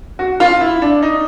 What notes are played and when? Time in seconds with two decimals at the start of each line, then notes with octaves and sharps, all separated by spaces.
0.19 F#4
0.40 F4
0.61 E4
0.82 D4
1.02 D#4